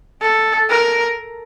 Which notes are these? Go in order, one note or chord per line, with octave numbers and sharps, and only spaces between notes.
A4
A#4